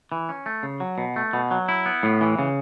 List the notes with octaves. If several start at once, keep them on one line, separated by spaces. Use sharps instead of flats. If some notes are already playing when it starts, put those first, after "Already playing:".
E3
C#4
A3
C#3
F#3
B2
A3
B2
F#3
E4
B3
A2
E3
C#3